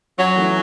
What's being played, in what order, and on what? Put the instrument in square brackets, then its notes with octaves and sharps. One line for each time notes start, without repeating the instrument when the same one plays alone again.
[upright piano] F#2 [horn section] F#3
[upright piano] E3 A3 C#4 E4